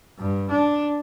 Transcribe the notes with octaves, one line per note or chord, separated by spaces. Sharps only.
G2
D4